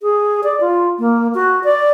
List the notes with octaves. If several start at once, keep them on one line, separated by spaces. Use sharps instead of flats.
G#4
D5
F4
A#3
F#4
D5